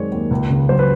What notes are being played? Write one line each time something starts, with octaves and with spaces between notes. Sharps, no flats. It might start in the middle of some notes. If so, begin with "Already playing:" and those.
Already playing: F#2 D#3 G#3 C4 C#5 D5
D#2
C#2
C#3
F#3 C5
B4